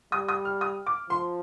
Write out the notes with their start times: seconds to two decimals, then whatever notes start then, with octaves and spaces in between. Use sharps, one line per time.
0.12 G3 D#6
0.28 D#6
0.45 F6
0.61 D#6
0.86 D6
1.10 F3 C6